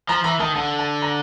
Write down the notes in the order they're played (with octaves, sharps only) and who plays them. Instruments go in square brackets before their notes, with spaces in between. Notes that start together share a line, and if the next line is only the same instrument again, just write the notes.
[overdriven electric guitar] F3 [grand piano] A#5
[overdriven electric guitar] E3 [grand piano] A#5
[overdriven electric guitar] D#3 [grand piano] A5
[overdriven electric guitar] D3 [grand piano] A5
[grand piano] A5
A#5